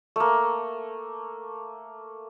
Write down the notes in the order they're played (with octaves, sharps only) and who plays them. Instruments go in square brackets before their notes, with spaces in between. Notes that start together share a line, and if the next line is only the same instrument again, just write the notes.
[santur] A3 A#3